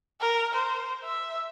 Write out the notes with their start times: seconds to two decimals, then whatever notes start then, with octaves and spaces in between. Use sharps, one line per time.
0.20 A#4
0.53 C5
1.05 E5